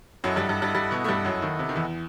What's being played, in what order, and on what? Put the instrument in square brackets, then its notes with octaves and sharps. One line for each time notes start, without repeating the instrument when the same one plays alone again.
[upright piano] F#2 F#3 [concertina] E4 A4 D#5 F#5
[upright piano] G2 G3
G2 G3
G2 G3
G2 G3
B2 B3
A3
G2 G3
F#2 F#3
D#2 D#3
C3
D#3
E2 E3